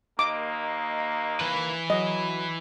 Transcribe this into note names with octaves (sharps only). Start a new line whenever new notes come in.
D#2 A#3 D#5 D6
E3 B4
F#3 D#5